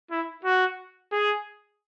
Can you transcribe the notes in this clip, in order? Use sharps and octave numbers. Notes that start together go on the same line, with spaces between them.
E4
F#4
G#4